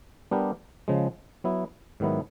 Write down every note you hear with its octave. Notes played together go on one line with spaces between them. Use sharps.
G3 B3 D4 G4 A#4
C#3 F3 G#3
F#3 B3 E4
G#2 D#3 F#3 B3 E4